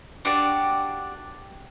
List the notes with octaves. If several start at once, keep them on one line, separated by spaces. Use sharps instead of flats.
D4 F#4 G4 D5